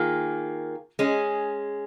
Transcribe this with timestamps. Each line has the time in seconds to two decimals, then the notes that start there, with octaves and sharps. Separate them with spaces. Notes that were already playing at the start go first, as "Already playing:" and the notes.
Already playing: D#3 A#3 F4 G#4
0.99 G#3 C#4 G#4